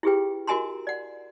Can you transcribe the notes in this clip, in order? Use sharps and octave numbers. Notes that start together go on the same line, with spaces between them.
E4 F4 G4 G#4 B4 G5
F#4 A#4 D#5 G#5 A#5 C6
D5 F#5